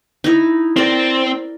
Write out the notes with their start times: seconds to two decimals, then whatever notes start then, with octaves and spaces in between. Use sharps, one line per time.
0.24 D#4 E4
0.76 C4 A#4 D5